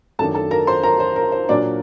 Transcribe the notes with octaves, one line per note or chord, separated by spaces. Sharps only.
F#2 D#3 A3 D4 A4 A5
A4 A5
A#4 A#5
C5 C6
A#4 A#5
C5
A#4
C5
A#2 F#3 A#3 D4 D5